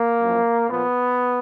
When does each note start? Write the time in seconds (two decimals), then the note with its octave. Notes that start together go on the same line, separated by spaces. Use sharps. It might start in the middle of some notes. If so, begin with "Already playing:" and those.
Already playing: A#3
0.21 F#2 F3
0.67 A#2 F3 B3